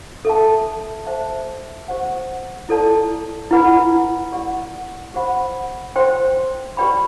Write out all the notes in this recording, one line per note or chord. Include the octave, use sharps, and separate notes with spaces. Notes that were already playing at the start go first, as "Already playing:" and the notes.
A4 E5 A5
C5 E5 A5
G4 C5 F#5
E4 A4 D5 A5
E4 B4 F#5 B5
G4 D5 F#5
G4 C5 F#5 B5
C5 G5 C6
G4 B4 D5 G5 B5